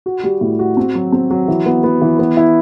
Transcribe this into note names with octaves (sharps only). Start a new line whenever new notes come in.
F#4
G3
A2
F#4
C4
F#3
C4
F#3
E3
B3
B3
E3
B3
E4